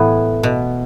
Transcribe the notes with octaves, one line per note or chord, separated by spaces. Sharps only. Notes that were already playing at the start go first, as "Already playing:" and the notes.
Already playing: A2 E3 B3
B2